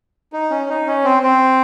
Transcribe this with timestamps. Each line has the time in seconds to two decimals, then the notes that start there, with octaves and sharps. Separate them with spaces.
0.33 D#4
0.51 C#4
0.69 D#4
0.87 C#4
1.04 C4
1.23 C4